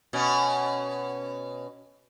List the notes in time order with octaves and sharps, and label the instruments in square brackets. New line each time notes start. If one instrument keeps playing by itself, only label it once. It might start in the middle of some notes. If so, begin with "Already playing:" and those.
[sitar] B2 C#4